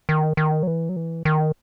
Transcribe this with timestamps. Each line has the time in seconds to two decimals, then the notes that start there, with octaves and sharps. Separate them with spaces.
0.09 D#3
0.37 D#3
0.63 F#3
0.67 E3
0.89 F#3
0.96 E3
1.25 D#3